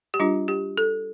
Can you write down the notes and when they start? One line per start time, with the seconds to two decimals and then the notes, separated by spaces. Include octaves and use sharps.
0.14 G4
0.20 G3 D4 F4
0.48 G4
0.77 A4